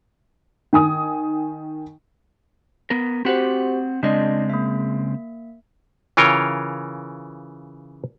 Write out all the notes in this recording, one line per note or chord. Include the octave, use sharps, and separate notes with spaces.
D#3 G#5 D#6
B3 A#4
C4 F#4 G4 C5 F#5
C#3 G#3 C4 D4 D5 D#5
A#3 E5
C#3 E3 F4 A#4 C#5 G5